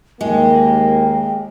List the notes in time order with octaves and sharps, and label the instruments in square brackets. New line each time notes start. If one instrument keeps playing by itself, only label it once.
[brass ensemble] D#2 A#3 [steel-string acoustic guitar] G#3 [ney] G5